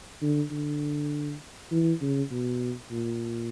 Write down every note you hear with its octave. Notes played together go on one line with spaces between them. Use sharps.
D3
D3
E3
C#3
B2
A#2